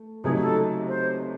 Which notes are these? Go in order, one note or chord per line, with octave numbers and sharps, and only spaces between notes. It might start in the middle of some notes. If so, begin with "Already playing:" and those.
Already playing: A3
C#2 C3 F#3 A3 D#4 G#4
A4
C5